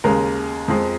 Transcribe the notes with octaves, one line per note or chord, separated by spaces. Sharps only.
D#2 C#3 G#3 A#4
F2 F3 G#3